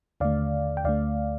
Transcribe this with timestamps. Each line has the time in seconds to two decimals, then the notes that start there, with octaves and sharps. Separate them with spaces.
0.20 D#2 D3 A3 D5 F5
0.77 G5
0.84 D2 D3 A3 D5 F5